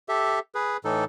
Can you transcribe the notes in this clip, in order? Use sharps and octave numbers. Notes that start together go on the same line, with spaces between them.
G4 A4 E5
G#4 B4
A2 E3 D#4 A4